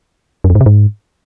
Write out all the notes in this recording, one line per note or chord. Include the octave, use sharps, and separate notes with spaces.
F#2
F2
G#2
C3
G#2